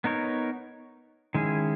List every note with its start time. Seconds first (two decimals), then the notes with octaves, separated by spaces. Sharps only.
0.04 B3 D#4 A#4 C#5
1.34 D#3 G#3 C#4 E4 G#4